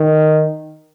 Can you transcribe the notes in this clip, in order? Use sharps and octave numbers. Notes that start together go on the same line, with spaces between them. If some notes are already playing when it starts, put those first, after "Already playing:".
Already playing: D#3